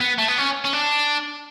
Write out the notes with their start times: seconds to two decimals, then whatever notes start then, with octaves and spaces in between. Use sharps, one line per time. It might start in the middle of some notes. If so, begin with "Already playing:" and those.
0.01 B3
0.18 A3
0.28 B3
0.38 C#4
0.65 C#4
0.73 D4